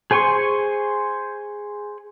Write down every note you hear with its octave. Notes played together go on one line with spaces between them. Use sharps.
G#4 C5 G#5 C6 C#6